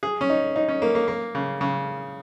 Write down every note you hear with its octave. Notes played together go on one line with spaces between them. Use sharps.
G#4
C#4
D#4
D#4
C#4
A#3
A#3
A#3
C#3
C#3